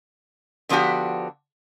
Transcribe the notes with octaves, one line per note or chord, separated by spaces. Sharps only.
D3 F3 B3 D4 F#4 G4